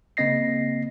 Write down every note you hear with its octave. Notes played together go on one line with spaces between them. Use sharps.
C#3 A#3 C4 D#5 A#6 C7